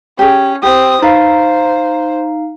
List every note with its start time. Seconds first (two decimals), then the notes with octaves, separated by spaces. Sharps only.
0.19 C#4 G4 G#4
0.63 C4 G4 D#6
1.02 D#4 B4 C5 F5